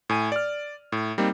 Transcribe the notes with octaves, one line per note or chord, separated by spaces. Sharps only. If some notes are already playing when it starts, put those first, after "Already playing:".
A2 G#5 D#7
D5 F6
A2
G3 A#3 C4 D#4